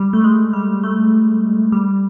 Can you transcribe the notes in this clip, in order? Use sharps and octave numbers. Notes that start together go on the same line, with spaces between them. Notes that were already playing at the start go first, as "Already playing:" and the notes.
Already playing: G3
A3
G#3
G3
A3
G3